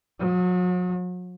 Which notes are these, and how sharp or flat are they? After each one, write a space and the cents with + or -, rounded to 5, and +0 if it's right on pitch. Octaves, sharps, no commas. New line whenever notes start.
F#3 -40